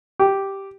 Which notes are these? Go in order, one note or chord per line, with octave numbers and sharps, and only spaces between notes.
G4